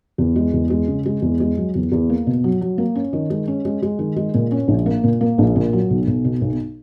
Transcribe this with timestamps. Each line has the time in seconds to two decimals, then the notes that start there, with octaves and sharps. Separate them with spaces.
0.18 E2
0.36 G#3
0.53 E2
0.70 G#3
0.88 C#3
1.06 G#3
1.22 E2
1.40 G#3
1.57 F#3
1.75 E2
1.92 E2
2.09 A#3
2.27 B2
2.44 F#3
2.61 F#3
2.78 A#3
2.95 C#4
3.13 D#3
3.30 G#3
3.48 C#4
3.65 G#3
3.82 G#3
3.99 D#3
4.16 G#3
4.34 A#2
4.52 C#4
4.68 A#1
4.86 A#3
5.04 A#2
5.21 A#3
5.38 A#1
5.56 A#2
5.73 F#3
5.90 B1
6.07 B1
6.25 B2
6.42 B1